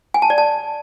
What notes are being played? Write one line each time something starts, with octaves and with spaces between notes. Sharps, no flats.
G#5
A5
D5
A5